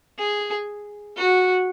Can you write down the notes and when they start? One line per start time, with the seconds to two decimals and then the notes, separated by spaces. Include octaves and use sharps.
0.18 G#4
1.16 F#4